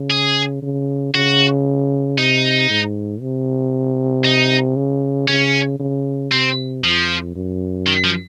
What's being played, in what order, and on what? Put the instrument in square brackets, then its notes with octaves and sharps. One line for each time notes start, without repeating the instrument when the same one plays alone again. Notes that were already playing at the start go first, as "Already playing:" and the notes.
Already playing: [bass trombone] C#3
[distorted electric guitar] G#4
[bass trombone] C#3
[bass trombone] C#3 [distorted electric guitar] F#4
[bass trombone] C3 [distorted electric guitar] D#4
[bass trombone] G#2
C3
[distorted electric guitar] D#4
[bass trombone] C#3
[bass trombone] C#3 [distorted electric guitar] C#4
[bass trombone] C#3
[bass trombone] C3 [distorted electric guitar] C4
[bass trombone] F2 [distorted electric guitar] F3
[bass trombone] F#2
[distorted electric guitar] D#3
F3